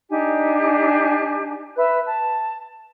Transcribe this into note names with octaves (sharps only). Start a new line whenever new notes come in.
D4 D#4 G4 G#5
B4 E5 E6 F#6
A5